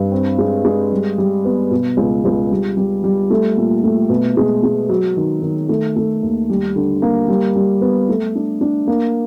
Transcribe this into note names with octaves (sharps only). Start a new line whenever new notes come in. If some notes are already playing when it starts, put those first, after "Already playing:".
Already playing: G2
C4
G#3
G#3
G3
G3
B3
B2
C#2
C#2
G3
G3
G3
A3
A#2
A3
B2
G#3
G#3
F#3
D#3
D#3
A3
A3
D#2
G3
D3
A#3
G3
G3
B3
A3
D4
D4
A#3